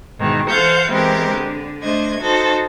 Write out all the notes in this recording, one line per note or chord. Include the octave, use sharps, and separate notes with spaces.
G#2 B2 D#3 E3
E3 A4 C5 F5 F#5 G6
E3 G#3 B3 C4 G4 A#4
D3
A3 D4 C5 D#5 G#6
D#4 F#4 A4 C5